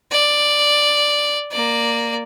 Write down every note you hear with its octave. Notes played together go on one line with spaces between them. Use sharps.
D5
A#3 D5